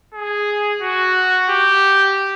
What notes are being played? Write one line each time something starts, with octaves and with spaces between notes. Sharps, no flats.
G#4
F#4
G4